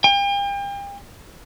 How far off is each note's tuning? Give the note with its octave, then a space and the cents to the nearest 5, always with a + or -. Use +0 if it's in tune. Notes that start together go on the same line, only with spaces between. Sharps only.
G5 +40